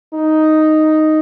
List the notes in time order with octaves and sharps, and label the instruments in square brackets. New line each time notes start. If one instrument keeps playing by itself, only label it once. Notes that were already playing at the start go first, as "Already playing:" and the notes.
[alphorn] D#4